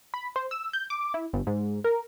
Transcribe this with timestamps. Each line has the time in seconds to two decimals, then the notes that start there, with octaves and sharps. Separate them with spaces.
0.14 B5
0.36 C5
0.51 E6
0.73 G6
0.90 D6
1.14 E4
1.33 G1
1.47 G#2
1.84 A#4